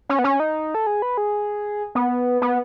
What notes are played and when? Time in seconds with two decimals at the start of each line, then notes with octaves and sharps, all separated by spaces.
0.09 C#4
0.19 B3
0.24 C#4
0.40 D#4
0.75 A4
0.87 G#4
1.02 B4
1.17 G#4
1.95 B3
2.42 B3